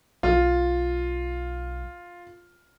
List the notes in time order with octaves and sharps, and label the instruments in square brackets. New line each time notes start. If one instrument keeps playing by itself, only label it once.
[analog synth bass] B1 [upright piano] F4